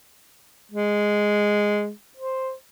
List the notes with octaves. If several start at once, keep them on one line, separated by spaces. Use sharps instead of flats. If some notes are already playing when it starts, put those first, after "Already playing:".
G#3
C5